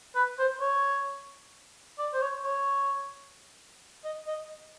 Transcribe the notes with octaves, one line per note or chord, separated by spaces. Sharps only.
B4
C5
C#5
D5
C5
C#5
C#5
D#5
D#5